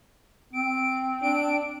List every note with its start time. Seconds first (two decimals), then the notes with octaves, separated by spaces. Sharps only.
0.53 C4 D7
1.22 D4 D7